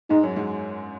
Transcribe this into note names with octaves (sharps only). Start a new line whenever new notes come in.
G#2 G#3 D#4
F#2 F#3
G#2 G#3